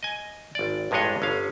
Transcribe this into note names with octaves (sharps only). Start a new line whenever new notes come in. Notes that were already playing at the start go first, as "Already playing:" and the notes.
D#5 G#5
G#1 D5
A1 G2 G#3 D4 C#5 D#5
G1 C#4 F5